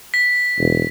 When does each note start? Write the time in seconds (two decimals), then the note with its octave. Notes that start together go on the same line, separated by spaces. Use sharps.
0.14 B6
0.58 E1